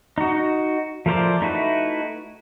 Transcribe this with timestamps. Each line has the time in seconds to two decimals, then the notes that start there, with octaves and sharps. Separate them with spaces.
0.18 D#4 F#4
1.06 F3 A3 A#4 C5 D5
1.41 A3 D#4 E4 F#4 B4